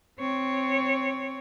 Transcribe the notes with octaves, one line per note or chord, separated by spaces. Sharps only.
C4 C#5